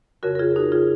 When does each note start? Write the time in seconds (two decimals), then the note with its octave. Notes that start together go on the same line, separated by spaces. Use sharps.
0.23 F2 C#3 F#4 A#4
0.35 A#4
0.39 F4 G#4
0.56 D#4 F#4
0.72 C#3 F4 G#4